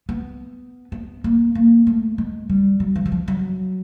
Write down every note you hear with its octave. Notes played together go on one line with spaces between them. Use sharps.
B3
B3
A#3
A#3
A3
G#3
G3
F#3
E3
E3
F3
F#3